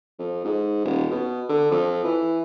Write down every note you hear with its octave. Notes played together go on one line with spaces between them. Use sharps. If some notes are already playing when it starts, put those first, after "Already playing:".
F2
G#2
D#1
B2
D3
F2
E3